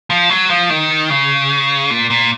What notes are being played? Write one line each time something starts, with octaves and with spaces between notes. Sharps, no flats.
F3
F#3
F3
D#3
C#3
A#2
A#2